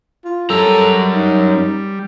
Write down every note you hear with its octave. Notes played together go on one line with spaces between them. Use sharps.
F4
F#2 G3 A4 A#5
D#4